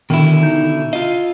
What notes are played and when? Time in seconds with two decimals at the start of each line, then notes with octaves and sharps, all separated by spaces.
0.10 B2 D3 D#3 E4
0.43 D#4
0.93 F4 D#5 F5